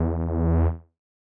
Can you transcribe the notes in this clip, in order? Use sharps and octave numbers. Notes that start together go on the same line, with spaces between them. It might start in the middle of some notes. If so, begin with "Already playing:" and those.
Already playing: E2